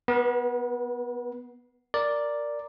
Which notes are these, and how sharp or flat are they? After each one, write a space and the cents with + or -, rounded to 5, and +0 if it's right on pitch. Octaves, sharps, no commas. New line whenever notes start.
B3 +0 B4 -40
A#4 +0 D5 +0